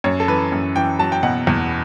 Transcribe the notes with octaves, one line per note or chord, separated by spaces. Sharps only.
F#2 C#5
A4
E3 B4
F#2
E3 G5
F#3 A5
G5
B2 F#5
E2